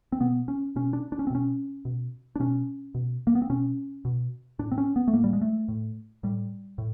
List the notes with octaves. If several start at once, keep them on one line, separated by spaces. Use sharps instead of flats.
C4
B2 B3
C#4
B2 C#4
D4
D4
C#4
C4
B2 C#4
B2
D4
B2 C#4
B2
A#3
B3
C4
B2 C#4
B2
A2 D4
C4
C#4
B3
A3
A2 A#3
G3
G#3
A3
A2
A2 G3
A2